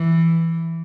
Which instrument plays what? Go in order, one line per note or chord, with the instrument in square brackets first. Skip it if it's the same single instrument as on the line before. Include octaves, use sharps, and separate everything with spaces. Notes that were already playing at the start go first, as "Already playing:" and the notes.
Already playing: [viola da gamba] E3